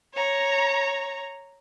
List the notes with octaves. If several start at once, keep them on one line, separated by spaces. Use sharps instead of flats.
C#5 A#5